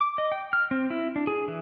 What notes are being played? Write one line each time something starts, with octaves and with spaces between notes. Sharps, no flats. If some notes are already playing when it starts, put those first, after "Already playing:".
D6
D#5
G5
F6
C4
E4
D4
G#4
E3